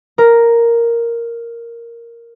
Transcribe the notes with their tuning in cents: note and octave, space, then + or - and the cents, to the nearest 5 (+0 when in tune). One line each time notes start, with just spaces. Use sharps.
A#4 +0